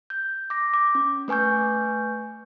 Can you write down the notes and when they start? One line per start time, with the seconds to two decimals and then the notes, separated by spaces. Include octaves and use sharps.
0.10 G6
0.50 D6 A#6
0.74 D6
0.95 C#4
1.28 A3 B4 G#5 C#6 G6